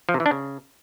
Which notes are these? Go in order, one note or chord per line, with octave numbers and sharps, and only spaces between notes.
F3
C3
E3
D4
C#3